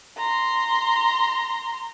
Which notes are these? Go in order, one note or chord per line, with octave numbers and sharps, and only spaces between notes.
A#5 C6